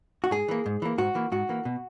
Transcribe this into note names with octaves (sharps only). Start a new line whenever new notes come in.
F#4
G#2 G#4
E3 A#3
G#2
E3 A#3
G#2 F#4
E3 A#3
G#2 F#4
E3 A#3
B2